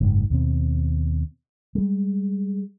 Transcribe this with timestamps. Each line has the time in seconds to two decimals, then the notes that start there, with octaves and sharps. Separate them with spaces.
0.01 F#1 G#2
0.30 D#2 B2 C4
1.75 G3 G#3